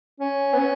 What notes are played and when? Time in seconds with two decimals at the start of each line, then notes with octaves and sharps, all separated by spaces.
0.20 C#4
0.54 B3
0.59 C#4